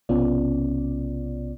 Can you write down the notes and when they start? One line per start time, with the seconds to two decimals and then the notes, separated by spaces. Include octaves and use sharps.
0.09 B1 C3 B3 C#4 F4 D5